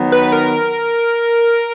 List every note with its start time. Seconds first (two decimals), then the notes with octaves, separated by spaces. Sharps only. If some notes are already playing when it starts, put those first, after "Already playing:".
Already playing: D#3 F#3 B3
0.12 B4
0.32 A#4